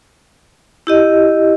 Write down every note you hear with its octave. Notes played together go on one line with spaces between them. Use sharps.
E4 G4 D#5